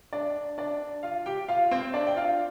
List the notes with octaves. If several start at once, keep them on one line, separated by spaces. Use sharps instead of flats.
D4 D5
D4 D5
F4 F5
G4 G5
F4 F5
C4 C5
D4 D5
G5
F4 F5